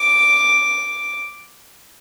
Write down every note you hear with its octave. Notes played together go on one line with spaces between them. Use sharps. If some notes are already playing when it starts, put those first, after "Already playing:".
Already playing: D6